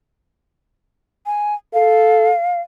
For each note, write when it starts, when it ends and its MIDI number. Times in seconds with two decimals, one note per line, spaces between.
1.26 1.55 80
1.74 2.32 69
1.74 2.61 77